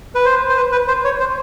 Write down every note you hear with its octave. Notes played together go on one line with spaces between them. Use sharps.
B4
C5
C5
B4
B4
C5
C#5
C5